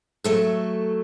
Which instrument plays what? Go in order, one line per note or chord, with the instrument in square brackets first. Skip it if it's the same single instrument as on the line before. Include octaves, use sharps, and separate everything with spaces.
[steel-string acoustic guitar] F#3 A3 A4